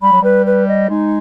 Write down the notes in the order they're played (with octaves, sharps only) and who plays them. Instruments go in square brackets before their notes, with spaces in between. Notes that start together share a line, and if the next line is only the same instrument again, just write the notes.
[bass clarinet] G3 [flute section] B5
[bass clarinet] F#3
[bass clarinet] G3 [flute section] B4
[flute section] B4
D#5
[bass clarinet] G#3 [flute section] D#4